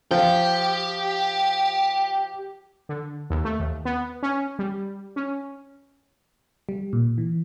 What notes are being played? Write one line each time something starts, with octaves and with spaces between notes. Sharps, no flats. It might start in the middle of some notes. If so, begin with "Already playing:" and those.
F3 G4
D3
D#2
A3
D#2
B3
C#4
G3
C#4
G3
A#2
E3